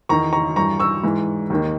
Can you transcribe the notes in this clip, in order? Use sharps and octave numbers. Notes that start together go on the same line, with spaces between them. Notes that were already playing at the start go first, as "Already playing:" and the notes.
E2 D#3 A#5 C#6
A#5 C#6
G2 E3 A#5 C#6
C#6 E6
G#2 E3
D#2 D#3